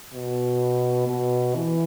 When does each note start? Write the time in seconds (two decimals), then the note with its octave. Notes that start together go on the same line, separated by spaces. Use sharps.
0.14 B2
1.08 B2
1.55 E3